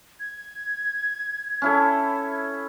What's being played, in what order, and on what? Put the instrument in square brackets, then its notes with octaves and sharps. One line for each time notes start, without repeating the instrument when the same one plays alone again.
[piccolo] G#6
[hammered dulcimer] C#4 E4 A4